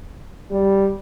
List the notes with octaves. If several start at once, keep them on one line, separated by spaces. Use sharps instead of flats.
G3